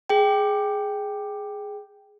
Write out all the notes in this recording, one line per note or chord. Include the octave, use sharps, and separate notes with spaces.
G#4 G5